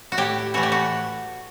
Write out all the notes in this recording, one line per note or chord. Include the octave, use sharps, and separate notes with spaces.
F#4
A2 G4
E3 A3 F#4
G4
F#4